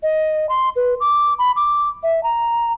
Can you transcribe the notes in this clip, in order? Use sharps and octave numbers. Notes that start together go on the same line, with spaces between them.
D#5
C6
B4
D6
B5
D6
E5
A#5